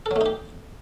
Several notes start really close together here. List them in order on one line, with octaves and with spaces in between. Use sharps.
A4 F#3 A3 D#4 G4